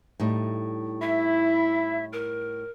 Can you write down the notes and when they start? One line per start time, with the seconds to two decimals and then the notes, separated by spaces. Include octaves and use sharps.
0.20 A2 G3 D#4
1.02 E4 E5
2.13 A#4